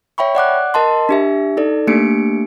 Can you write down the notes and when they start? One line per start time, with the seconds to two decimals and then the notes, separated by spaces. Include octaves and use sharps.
0.18 C#5 E5 G5 B5 C#6
0.35 D5 F#5 D6 F#6
0.74 A#4 D#5 A5 C6
1.09 D4 G4 E5
1.57 D#4 A4 D5
1.87 A3 A#3 D4 G4 C#7 D7